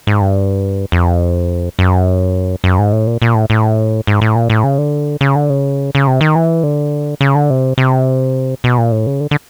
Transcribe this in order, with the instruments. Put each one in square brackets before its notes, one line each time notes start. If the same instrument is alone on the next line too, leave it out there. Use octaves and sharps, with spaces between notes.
[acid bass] G#2
G2
F2
F#2
F#2
G#2
A2
A#2
A#2
A2
A2
G#2
A2
A#2
A2
C#3
D3
C#3
D3
C#3
C#3
C3
D#3
E3
D3
C#3
D3
C3
C3
B2
A#2
A2
C#3
D3
D3